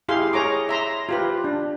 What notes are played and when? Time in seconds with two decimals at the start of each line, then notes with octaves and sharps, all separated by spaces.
0.09 E4 G4 G#4 F5 C6
0.33 G#4 C#5 A#5 D6
0.69 E5 A#5 C6
1.09 F4 G4 B4
1.44 D4